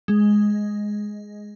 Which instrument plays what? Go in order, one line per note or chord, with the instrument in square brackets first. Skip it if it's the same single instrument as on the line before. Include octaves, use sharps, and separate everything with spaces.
[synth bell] G#3